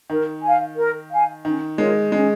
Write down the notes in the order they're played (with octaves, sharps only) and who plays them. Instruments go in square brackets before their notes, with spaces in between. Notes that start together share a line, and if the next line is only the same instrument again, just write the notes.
[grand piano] D#3 [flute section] A#4
[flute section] F5 G#5
A#4
F5 G#5
[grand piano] D#3 [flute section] C#4
[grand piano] G#3 [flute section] F4 A#4 C#5
[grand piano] G#3 [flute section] C#4